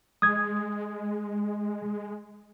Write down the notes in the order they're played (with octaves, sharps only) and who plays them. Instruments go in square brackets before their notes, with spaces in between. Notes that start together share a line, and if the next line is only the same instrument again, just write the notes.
[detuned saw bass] G#3 [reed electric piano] D#6 G#6